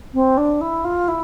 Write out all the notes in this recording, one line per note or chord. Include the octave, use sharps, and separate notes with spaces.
C4
D4
E4
F4
E4